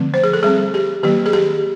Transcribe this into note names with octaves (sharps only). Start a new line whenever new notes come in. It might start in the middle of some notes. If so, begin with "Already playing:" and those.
Already playing: D3 F3 A3 C4
C5
G#4
A4
G3 C4 G#4
G4
D#3 F#3 A#3 G4
G#4
G4